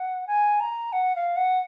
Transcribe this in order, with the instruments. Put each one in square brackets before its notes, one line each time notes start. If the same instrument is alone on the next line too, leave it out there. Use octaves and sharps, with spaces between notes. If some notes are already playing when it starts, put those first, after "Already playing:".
Already playing: [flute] F#5
G#5
A#5
F#5
F5
F#5